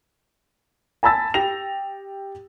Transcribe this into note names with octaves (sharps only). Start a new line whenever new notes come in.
G#5 A5 B5 E6 A6
G4 G5 A#6 F7